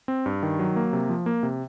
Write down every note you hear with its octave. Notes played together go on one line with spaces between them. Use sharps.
C4
G2
D#3
F#3
A#3
C3
F3
A#3
C3